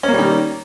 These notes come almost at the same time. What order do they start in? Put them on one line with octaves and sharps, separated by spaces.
C#4 A#3 G3 D#3